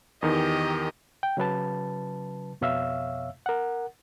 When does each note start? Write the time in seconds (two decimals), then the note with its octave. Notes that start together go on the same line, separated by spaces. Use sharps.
0.22 E2 D#3 G4 D#5
1.23 G5
1.37 C#3 F#3 B4 A5
2.61 F2 B2 C#5 E5 F5 E6
3.46 A#4 F#5